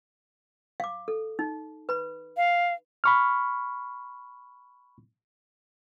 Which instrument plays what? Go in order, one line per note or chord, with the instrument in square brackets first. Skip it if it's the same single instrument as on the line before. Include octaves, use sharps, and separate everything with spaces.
[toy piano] F5 D6
A4
D#4
B4 B5
[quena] F5
[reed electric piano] B5 C#6 F6